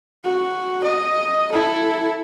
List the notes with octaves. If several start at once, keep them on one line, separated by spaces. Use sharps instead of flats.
F#4
D#5
E4 A4